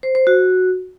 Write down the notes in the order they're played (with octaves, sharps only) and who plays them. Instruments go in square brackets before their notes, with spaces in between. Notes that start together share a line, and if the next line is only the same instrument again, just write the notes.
[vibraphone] C5
C5
F#4